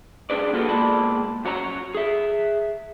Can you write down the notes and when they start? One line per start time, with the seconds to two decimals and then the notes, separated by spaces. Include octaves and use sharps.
0.30 C#2 D4 G#4 B4 D5
0.53 A#3 B3 F4 F#4 G#4 A4
0.68 B2 G#3 A#3 D5 A5 B5
1.45 F#2 F#4 C#5 A#5
1.95 G#4 E5